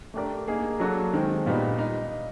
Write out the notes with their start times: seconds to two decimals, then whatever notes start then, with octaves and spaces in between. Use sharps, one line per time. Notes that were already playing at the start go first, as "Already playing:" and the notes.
0.14 A3 D4 G4 A#4 D5
0.48 A#3 D#4 G#4
0.80 F#3 A#3 D4 F#4 A4
1.13 D#3 G#3 C4
1.46 A#2 G3 B3 D#4
1.79 D#4